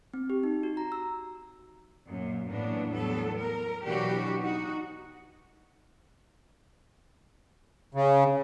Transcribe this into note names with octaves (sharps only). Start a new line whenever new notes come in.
C4
G4
D#4
F#4
A#5
E6
F#2 A#2
A2 E3 F#3 A#3 B3 D4
E2 A2 F#3 G3 B3 A4
A#4
B2 E3 F#3 D4 F#4 G4
D#4 F#4
C#3